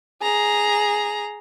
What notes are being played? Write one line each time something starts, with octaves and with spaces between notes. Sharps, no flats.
G#4 A#5